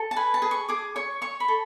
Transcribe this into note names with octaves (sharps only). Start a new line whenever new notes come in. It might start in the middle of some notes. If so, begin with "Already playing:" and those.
Already playing: A4
A5
B4 G#5
A5
G#4
C#6
G#4 D6
C#5 C#6
C#5 C#6
B5
A4